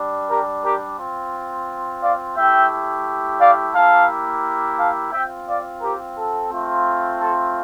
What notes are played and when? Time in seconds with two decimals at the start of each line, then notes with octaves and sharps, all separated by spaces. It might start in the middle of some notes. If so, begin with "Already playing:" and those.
Already playing: G3 D4
0.29 G4 A#4
0.63 G4 A#4
0.98 C4 F4
2.02 D5 F5
2.36 A3 E4 G4 E5 G5
3.40 D5 F5
3.74 A#3 E4 G4 F5 A5
4.77 F5 A5
5.12 C4 F4 E5 G5
5.47 D5 F5
5.82 G4 A#4
6.17 A4
6.51 A3 C4 F4
7.21 A4